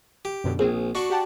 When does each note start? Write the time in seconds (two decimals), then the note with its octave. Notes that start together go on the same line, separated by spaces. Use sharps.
0.25 G4
0.44 F#2 B2 D3
0.59 A#1 C4 G#4
0.95 D4 F#4 C#6
1.10 G4 F#5 A5